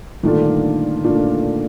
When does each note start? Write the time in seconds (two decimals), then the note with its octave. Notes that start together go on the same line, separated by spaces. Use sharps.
0.23 G2 A#2 D3 D#3 A3 D4 F4
1.04 A#2 A3 D4 F4